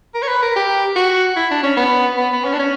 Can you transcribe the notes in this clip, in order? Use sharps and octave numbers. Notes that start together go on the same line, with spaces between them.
A#4
C#5
B4
A#4
G4
F#4
E4
D4
C#4
B3
B3
B3
C#4
D4
C#4